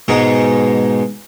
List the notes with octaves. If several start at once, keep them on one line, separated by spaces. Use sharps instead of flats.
G#2 B2 G#3 D#4